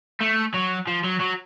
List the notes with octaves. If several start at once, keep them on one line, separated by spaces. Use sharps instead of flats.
A3
F#3
F3
F#3
F#3